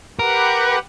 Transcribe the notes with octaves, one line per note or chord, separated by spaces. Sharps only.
G4 A#4 B4 F#5